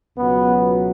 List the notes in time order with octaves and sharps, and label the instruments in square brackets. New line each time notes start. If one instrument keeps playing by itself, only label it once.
[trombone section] C#2 B2 F#3 B3